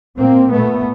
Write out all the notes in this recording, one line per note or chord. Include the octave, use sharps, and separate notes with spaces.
A#2 A#3 C4
A#2 A3 B3